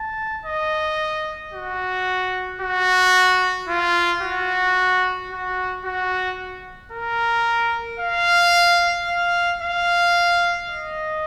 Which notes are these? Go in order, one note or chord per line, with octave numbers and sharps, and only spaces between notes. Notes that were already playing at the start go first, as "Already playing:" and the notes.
Already playing: A5
D#5
F#4
F#4
F4
F#4
F#4
F#4
A#4
F5
F5
F5
D#5